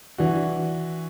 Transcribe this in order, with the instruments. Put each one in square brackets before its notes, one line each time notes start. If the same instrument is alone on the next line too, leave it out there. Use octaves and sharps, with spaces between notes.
[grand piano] E3 D4 F#4